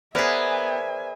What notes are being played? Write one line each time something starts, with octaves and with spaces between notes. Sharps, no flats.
B3 G#4 A#4 C5 D5 E5 G#5